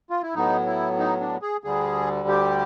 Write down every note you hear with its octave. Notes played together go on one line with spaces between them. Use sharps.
F4
E4
A2 F#3 B3 D#4
E4
D#4
D4
G#4
D2 D3 G3 G#4
G4